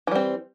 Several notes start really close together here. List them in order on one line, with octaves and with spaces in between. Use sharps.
E3 G3 C4